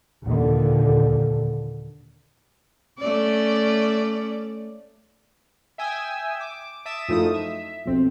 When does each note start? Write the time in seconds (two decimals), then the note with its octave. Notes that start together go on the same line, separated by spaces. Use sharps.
0.24 D#2 A#2 D3
2.99 A3 C#4 D5
5.78 E5 G5 G#5 D#6 E6
6.41 D6
6.86 E5 A5 D6 D#6 E7
7.09 F#2 F3 A3 D#4 E4 D#6
7.34 E5
7.86 B1 F2 C4